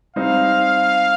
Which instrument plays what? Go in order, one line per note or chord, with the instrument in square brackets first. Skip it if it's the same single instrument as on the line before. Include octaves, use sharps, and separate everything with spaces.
[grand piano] G3 C4 D#4 [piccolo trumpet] F5